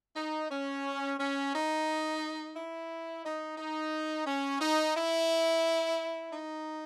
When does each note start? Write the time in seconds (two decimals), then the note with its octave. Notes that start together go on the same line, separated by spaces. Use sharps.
0.16 D#4
0.51 C#4
1.19 C#4
1.53 D#4
2.55 E4
3.25 D#4
3.58 D#4
4.26 C#4
4.61 D#4
4.96 E4
6.32 D#4